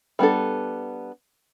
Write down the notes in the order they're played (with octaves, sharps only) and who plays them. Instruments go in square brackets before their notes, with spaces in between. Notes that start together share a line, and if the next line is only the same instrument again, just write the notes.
[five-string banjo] G3 B3 D4 A4